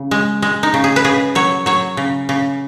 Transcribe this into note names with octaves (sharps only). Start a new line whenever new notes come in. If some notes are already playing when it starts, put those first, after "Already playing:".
Already playing: C#3
G#3
G#3
D#4
C#3
G#4
B4
C#3 G#4
F#3 C#5
F#3 C#5
C#3
C#3